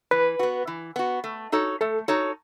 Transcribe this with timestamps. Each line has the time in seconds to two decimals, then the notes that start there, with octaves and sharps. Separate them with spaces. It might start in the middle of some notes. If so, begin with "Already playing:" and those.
0.11 E3 B4
0.39 B3 F#4
0.67 E3
0.96 B3 F#4
1.24 A3
1.52 D#4 F#4 A4 C#5
1.81 A3 A4
2.08 D#4 F#4 A4 C#5